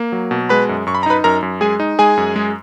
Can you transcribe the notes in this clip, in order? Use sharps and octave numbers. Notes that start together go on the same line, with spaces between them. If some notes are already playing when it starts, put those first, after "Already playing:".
Already playing: A#3
F#3
B2
G#3 B4 B5
F#2
F#2 C#6
B5
A#5
D#4 B4 B5
F#2 A#4 A#5
F#2
G#3 G#4 G#5
D#4
G#3 G#4 G#5
F#2
G#3